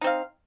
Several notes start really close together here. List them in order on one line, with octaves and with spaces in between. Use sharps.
D#4 C4 F5